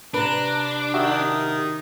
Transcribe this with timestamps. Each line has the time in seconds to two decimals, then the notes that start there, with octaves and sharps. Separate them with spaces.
0.14 C3 D4 B4 A#5
0.94 D#3 F#4 G4 A#4 D#5 E5